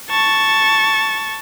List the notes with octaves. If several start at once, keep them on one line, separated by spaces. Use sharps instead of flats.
A5 C#6